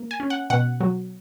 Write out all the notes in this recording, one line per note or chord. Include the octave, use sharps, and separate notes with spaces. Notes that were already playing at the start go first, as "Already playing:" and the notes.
Already playing: A#3
G#5
C#4
F#5
B2 F#5
F#3